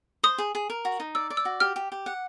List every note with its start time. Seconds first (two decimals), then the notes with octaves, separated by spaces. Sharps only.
0.23 C5 D#6
0.38 G#4
0.55 G#4
0.70 A#4
0.85 F#4
1.00 D#4
1.15 D5 E6
1.30 D5
1.37 E6
1.45 F#4
1.60 G4 F6
1.76 G4
1.92 G4
2.06 F#5